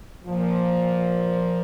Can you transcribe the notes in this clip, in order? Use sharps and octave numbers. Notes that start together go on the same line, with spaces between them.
A#2 F3